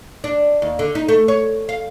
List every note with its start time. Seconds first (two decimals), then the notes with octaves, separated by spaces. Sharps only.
0.24 D4
0.62 D#2
0.79 D3
0.95 D#4
1.08 A3
1.28 C#5
1.69 F5